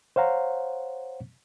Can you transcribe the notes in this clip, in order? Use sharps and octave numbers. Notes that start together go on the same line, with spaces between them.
C5 C#5 F5 F#5 A#5